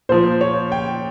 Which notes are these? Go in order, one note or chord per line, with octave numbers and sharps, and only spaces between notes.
A#2 F3 C5
C#5
G5